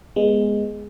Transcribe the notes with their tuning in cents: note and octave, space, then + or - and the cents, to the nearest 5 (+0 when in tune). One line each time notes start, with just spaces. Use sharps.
G#3 +0 B3 -15